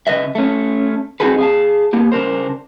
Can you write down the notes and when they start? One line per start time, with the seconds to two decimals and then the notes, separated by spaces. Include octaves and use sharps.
0.07 C#3 B4 D#5 E5
0.35 A3 C#4
1.20 C4 D#4 F#4 G#4 A4 B4
1.38 G#4 F5 A5
1.93 A#3 B3 G4
2.12 C#3 D4 A#4 C5